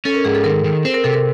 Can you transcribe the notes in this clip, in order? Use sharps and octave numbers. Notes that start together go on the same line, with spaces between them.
C#4 A4
A#4
G#2 G#4
A4
D#3 A#4
D#3
C4 C5
A#4
C3 A4
A#4